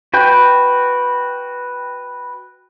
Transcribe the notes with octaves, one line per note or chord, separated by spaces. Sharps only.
F#4 B4 G5